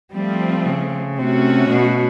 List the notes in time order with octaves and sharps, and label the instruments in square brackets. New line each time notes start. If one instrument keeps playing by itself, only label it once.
[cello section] F3 A3 C4 [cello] G3
[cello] C#3
[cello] C3 [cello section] A3 C#4 F#4
[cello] B2